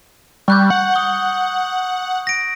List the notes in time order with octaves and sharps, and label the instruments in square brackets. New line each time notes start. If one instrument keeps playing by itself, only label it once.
[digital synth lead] G3 [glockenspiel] C#6 F#6 G6
[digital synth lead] F#5
[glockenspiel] D#6 G7
A#6 D7